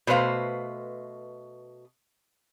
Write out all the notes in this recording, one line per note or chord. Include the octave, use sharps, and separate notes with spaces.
B2 A3 B4 C5 F5